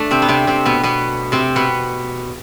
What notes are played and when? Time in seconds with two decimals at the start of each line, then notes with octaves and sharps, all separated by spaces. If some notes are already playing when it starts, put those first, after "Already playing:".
Already playing: A3 D4
0.11 C3 C4
0.22 B3
0.28 C3 C4
0.47 C3 C4
0.65 B2 B3
0.83 B2 B3
1.32 C3 C4
1.56 B2 B3